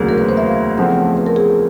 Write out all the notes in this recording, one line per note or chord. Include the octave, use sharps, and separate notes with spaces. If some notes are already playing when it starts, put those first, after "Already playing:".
Already playing: E1 D2 C#3 F#3 A#3
A#4
B4
C5
E5
F5
E2 C#3 F3 A3 C4 F#5
B4
A#4
G#4